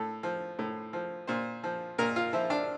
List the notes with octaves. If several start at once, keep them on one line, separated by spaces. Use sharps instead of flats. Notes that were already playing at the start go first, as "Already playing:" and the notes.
Already playing: A2 A4
F3
A2
F3
A#2 C5
F3
A#2 A#4
F4
F3 E4
D4